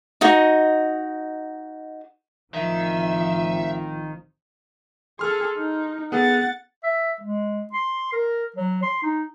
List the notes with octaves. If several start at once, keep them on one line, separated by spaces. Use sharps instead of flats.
D#4 F#4 D#5
A1 D#3 F3 C4 E5
G#4 A4 C6 F6
D#4
B3 G#4 A4 F#5 A6
E5
G#3
C6
A#4
F#3
C6
D#4